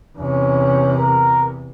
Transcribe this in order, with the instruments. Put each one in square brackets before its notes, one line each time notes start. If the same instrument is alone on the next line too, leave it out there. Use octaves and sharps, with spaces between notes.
[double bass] E2 C3 [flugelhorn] C#4
[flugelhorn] A#4